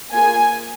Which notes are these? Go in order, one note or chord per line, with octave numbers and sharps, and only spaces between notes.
A#3 F4 G#4 G#5